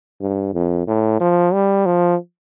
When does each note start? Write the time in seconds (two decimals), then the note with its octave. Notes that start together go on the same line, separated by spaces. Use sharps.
0.21 G2
0.54 F2
0.87 A2
1.21 F3
1.53 G3
1.86 F3